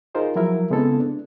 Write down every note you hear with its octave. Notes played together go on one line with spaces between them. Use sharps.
D#4 F4 G#4 A#4 C5 D#5
F3 F#3 E4 A#4 E5
C#3 G#3 B3 C4 E4 A4
D4